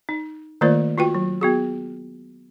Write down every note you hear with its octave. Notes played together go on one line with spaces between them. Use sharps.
D#4
D#3 A3 A#3 F4 C5 D5
F4 F#4 B4 G5
F#3
B3 F#4 G#4